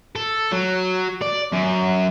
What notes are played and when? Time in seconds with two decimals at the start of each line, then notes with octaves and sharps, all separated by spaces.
0.16 A4
0.52 F#3
1.22 D5
1.53 F#2